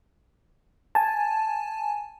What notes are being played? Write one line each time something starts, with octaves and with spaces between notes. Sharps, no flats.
G#5 A5